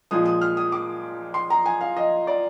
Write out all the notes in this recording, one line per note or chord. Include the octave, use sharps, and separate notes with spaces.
A#2 F3 G#3 D#6
D#6
F6
D#6
D6
C6
A#5
G#5
F5
D#5
D5